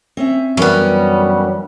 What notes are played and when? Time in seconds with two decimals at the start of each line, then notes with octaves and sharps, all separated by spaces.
0.17 C4 C#4 E5
0.57 F#2 E3 G3 B3 C#4 D4 A#4